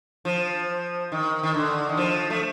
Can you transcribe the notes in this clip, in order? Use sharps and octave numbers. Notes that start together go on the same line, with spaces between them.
F3
D#3
D#3
D3
D#3
F3
A3